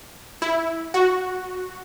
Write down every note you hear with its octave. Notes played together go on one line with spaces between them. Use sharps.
E4
F#4